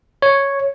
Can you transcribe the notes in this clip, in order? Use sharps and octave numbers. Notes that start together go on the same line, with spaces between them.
C#5